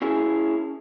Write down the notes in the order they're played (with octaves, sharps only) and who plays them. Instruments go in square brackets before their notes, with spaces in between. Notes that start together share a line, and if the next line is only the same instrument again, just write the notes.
[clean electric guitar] C#4 E4 G#4